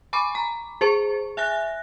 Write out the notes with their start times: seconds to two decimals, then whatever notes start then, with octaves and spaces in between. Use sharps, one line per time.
0.13 G#5 B5 C#6 D6
0.35 A#5
0.81 G#4 C5 C#6
1.37 E5 G#5 F#6 A#6